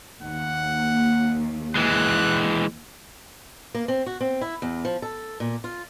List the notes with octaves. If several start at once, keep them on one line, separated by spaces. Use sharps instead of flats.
D#2 F#5
E3 G#3 F#6
A#3
C4
F#4
C4
E4
E2
F3
A4
A#2
F4